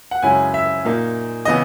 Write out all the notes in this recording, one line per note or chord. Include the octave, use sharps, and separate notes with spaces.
F#5
F#2 C#3 G#3 C#4 E4 G#5
E5
A#2 A#3 D#4
C#3 E3 B3 D#5